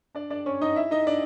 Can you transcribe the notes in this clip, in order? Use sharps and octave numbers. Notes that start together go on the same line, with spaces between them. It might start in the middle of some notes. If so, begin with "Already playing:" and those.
D4 D5
D4 D5
C#4 C#5
D#4 D#5
E4 E5
D#4 D#5
D4 D5